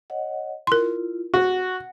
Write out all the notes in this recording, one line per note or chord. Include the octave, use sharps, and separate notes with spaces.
C#5 D#5 F#5
E4 F4 A#4 C6
F#4 F#5